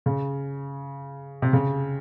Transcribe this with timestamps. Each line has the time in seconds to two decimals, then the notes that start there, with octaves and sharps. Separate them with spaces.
0.06 C#3
1.42 C3
1.53 C#3